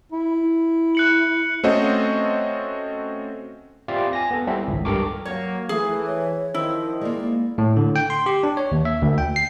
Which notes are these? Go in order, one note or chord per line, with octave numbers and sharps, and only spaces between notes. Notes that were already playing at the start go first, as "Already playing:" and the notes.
E4
F#6 C#7 F#7
A3 C4 C#4 F#4 C5 D#5
C4 F4 G4 D5 E5 F5
G#5 A#6
B3 A4
G3 C4 E4 E5
G#1 C#2
G2 G4 A4 A#4 C#6 D6
F#3 A#3 C#5
E3 A3 G#4
C#5
D#3 F3 E4 C5
G#3 A#3 D5
A2
D3
G5
C6
G4
D4
C#5
D#2
E5
D2
G5
C7